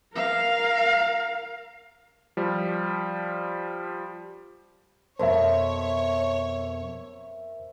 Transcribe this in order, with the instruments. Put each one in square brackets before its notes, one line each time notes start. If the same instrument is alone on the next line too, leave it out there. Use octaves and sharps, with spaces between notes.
[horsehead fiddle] A#4 F5
[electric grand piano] F3 G3
[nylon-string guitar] F2 B2 [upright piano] A#4 E5 [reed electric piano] C5 [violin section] C#5